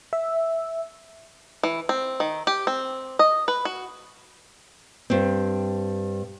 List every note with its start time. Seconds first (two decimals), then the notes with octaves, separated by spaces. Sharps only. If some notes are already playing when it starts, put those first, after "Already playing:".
0.13 E5
1.63 E3
1.89 C4
2.20 D#3
2.47 G4
2.67 C4
3.19 D#5
3.48 B4
3.65 F#4
5.10 G2 C4